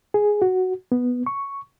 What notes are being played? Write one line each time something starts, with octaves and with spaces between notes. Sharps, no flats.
G#4
F#4
B3
C#6